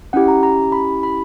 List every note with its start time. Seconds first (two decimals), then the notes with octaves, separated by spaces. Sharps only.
0.13 C#4 E4 G4 F#5
0.28 A#5
0.43 A#5
0.72 B5
1.03 B5